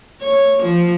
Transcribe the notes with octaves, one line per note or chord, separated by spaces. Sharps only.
C#5
F3